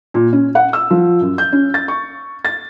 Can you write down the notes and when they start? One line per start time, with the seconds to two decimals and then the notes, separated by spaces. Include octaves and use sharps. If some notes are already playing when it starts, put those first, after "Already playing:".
0.14 A#2
0.33 C#4
0.55 F#5
0.73 E6
0.91 F3
1.21 F#2
1.38 G6
1.52 C#4
1.74 A6
1.88 C#6
2.45 A6